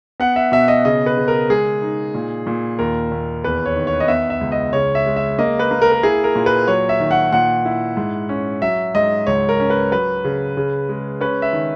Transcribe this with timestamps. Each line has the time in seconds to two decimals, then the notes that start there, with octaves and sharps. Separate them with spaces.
0.20 B3 F#5
0.36 E5
0.52 B2 E5
0.68 D#5
0.85 C#3 D#5
1.06 B4
1.17 C#3
1.28 A#4
1.49 G#3 G#4
1.82 D#4
2.15 A#2
2.47 A#2
2.79 D#2 A#4
3.11 D#2
3.44 E2 B4
3.66 C#5
3.76 D#3
3.87 C#5
4.00 D#5
4.08 B3 E5
4.30 E5
4.41 C#2
4.52 D#5
4.73 C#3 C#5
4.95 E5
5.06 G#3
5.16 E5
5.39 A#3 D#5
5.59 B4
5.71 A#3
5.82 A#4
5.92 A#4
6.03 E4 G#4
6.24 A#4
6.35 A#2
6.46 B4
6.67 F#3 C#5
6.89 E5
7.00 D#3
7.11 F#5
7.33 A#2 F#5
7.65 E4
7.97 G#2
8.29 C#4
8.62 F#3 E5
8.95 G#2 D#5
9.27 C#2 C#5
9.49 A#4
9.60 C#4
9.70 B4
9.92 F#3 B4
10.25 C#3
10.57 C#3
10.89 G#3
11.21 C#4 B4
11.42 E5
11.53 D#3